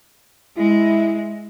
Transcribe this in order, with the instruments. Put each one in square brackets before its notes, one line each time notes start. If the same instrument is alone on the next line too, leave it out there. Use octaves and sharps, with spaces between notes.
[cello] G#3 [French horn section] E4